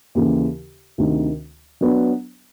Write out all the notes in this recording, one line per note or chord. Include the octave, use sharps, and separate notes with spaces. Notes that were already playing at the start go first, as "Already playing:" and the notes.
D#2 C#3 E3
D2 C3 D#3
F#3 B3 D4